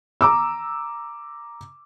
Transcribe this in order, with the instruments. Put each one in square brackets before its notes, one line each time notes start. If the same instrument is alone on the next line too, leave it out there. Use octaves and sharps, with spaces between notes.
[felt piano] A#5 D6 E6